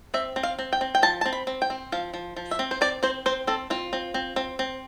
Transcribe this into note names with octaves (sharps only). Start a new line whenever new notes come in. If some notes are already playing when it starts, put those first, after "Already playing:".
C4 E5
C4
F5
C4
G5
C4
G5
F3 A5
C4 A5
B5
C4
G5
C4
F3 F5
F3
F3
E5
C4
C5
C4 D5
C4 C5
C4 C5
C4 A4
C4 F4
C4
C4
C4
C4